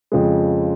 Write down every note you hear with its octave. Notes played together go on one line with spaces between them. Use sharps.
F2 C#3 F3 G#3